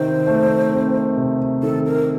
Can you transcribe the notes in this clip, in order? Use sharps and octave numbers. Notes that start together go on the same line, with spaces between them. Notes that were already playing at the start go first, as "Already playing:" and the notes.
Already playing: C3 D#3 C4 C5
A3
C4
C3
D#3 A4
A#4